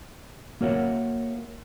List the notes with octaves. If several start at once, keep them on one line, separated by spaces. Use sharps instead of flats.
A#3 F#4 A#4 C#5 E5 F#5